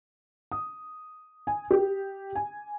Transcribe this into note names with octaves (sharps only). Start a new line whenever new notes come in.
D#6
G#5
G4
G#5